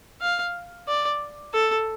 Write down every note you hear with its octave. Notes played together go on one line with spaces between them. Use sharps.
F5
D5
A4